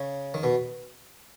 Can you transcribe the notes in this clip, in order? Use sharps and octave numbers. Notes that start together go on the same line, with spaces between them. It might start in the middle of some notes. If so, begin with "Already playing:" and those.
Already playing: C#3
D#3
B2